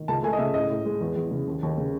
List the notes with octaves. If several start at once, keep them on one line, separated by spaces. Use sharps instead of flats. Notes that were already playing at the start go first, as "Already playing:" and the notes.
Already playing: D#3
C#2 A5
A3 G#5
D#5
C#3 E5
A2 D#5
A2
G#3
E2
E2
C#3
D#2
D#2
C#3